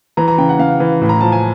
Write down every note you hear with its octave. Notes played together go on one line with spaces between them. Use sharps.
E3 A#5
A#5
C#3 G5
F#5
C#3 F5
E3
A2
A#5
F3 A5
G#5